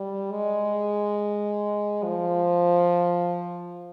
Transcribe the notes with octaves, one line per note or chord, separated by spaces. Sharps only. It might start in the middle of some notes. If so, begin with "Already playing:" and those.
Already playing: G3
G#3
F3